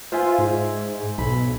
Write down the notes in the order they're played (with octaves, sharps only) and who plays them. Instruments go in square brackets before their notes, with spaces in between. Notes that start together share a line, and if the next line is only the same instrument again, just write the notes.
[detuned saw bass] F4 [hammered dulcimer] C5 E5 G#5
[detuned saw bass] G#2
[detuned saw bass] B1 [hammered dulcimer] B5